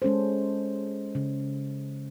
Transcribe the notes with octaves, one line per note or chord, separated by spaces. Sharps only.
G#3 C#4 A4 C5
C#3